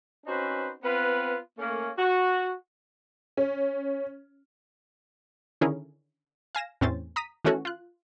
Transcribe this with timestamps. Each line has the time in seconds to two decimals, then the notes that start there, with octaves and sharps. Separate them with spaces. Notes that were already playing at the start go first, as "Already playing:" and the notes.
0.27 C4 C#4 D#4 F#4 B4 C5
0.83 B3 C4 F4 B4
1.59 A3 A#3 C#4
1.97 F#4
3.37 C#4
5.61 D3 D#3 C#4 E4 G#4 A#4
6.55 F5 G#5 A#6 E7
6.81 E2 A2 C4 C#4 C5 A6
7.16 A#5 D#6 B6 D#7
7.44 D#3 E3 A3 C#4 F#4 A4
7.65 F4 F#6